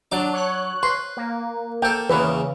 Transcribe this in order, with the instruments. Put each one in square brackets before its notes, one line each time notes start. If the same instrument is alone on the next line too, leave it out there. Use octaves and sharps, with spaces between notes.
[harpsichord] F#3 D6 [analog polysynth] D4
[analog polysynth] C#5 F#6
[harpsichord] B4 [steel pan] C6
[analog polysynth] A#3
[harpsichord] A#3 A4 [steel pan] G5
[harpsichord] E2 E3 A#3 [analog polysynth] C#3 [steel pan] B4